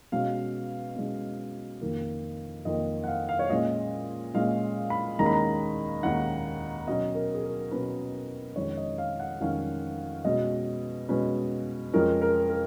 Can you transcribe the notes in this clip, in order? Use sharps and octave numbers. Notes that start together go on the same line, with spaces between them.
B2 G#3 C#4 F5
B2 G#3 C#4
F2 D#3 A#3
F2 D#3 A#3 D#5
F#5
F5
F5
C#5
A#2 G#3 C#4 D#5
A#2 G#3 C#4 F5
B5
D#2 D#3 G#3 C#4 A#5
B5
A#5
D#2 D#3 G#3 C#4 F#5
B2 F#3 C#4 D#5
A#4
G#4
A#4
B2 F#3 C#4 B4
F2 D#3 G#3 C#4 C#5
D#5
F5
F#5
F2 D#3 G#3 C#4 F5
B2 G#3 C#4 D#5
B2 G#3 C#4 B4
F2 F3 G#3 C#4 A#4
A#4
A#4